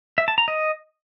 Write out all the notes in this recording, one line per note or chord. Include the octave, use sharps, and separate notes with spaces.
E5
A5
A#5
D#5